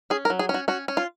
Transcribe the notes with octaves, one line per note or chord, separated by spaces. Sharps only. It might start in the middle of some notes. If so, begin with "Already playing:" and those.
C#4 G#4
A#4
F#3
G#4
C#4
F#4
C#4 F#4
C#4
F4